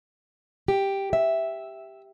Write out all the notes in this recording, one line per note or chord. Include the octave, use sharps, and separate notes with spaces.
G4
E5